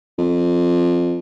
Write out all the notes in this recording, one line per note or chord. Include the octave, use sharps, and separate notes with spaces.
F2